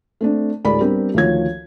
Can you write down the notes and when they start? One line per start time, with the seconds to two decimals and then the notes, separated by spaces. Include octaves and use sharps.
0.21 A3 C4 D4
0.64 D2 A2 G#3 A#4 D5 B5
0.81 G3 B3 C4 D4 G4 A#4
1.14 D2 D#3 F3 C#5 G#6